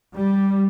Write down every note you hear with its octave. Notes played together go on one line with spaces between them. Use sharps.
G3